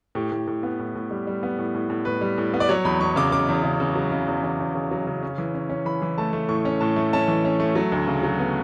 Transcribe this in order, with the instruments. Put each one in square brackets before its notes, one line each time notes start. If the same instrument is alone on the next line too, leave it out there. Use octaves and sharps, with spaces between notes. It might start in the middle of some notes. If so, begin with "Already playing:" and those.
[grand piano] A2 G4
A2
A2
B3
A2
A2
G3
G3
B3
A2
A2
A2
A2 B4
G3
A2
B3
D5
F#3 C#5
E2 B5
E2 C#6
C#3 D6
C#3 D6
E2
C#3
C#3
F#3
C#3
E2
E2
E2
C#3
F#3
C#3
C#4
E3
C#4
C#4
E3 B5
E3
A3 A5
A3
A2 C#6
C#4
A2 A5
A3
C#4 A5
E3
C#4
A3
F#3
D2
C#3
F#3
B3